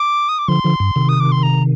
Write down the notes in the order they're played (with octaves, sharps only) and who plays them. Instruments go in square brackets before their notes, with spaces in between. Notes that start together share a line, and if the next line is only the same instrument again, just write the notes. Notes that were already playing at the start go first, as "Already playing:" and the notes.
Already playing: [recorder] D6
D#6
D6
[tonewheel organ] D3 F3 [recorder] C6
[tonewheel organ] D3 F3
G2
C3 D#3
[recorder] D#6
D6
C6
A#5